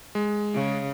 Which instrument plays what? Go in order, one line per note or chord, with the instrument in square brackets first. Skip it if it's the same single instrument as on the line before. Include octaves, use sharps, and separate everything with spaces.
[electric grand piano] G#3
[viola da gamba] C#3